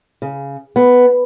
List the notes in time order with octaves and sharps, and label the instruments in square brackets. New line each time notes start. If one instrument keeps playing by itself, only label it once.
[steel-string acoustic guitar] C#3
B3